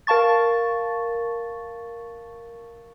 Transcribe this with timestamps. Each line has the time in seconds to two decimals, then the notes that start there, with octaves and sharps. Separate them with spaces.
0.07 A#4 F5 A5 C#6 A6